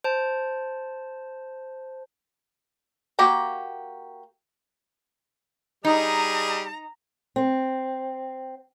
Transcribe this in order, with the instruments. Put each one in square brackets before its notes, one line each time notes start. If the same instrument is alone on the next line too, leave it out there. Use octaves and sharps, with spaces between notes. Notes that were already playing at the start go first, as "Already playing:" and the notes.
[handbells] C5 A5
[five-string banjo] A#3 F#4 G4 G5 A#5
[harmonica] G3 G#4 D#5 [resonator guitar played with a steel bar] D#4 [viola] A#5
[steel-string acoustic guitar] C4